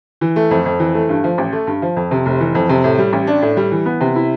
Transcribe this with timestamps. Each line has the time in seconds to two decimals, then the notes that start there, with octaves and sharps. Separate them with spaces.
0.21 E3
0.36 A3
0.51 F2
0.66 F2
0.80 E3
0.95 A3
1.09 G2
1.24 F3
1.38 A1
1.53 A3
1.67 G2
1.82 F3
1.96 F2
2.11 C3
2.26 F1
2.40 E3
2.55 F2
2.69 C3
2.84 A2
2.98 G3
3.13 A1
3.27 D4
3.42 A2
3.57 G3
3.72 E3
3.86 B3
4.01 C3
4.16 E4